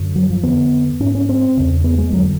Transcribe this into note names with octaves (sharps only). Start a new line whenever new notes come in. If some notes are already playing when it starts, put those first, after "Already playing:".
Already playing: F#2 D3
F#3
F3
F2 D3 B3
G#2 C#4
C#4
C4
E2 C#3
B3
G#3
F2 D3 F#3